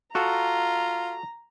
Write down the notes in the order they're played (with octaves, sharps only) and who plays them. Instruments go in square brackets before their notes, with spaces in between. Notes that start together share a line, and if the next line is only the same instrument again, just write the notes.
[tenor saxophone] F4 [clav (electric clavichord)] F#4 A4 [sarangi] A#5